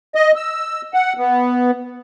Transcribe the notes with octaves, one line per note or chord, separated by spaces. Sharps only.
D#5
E6
F#5
B3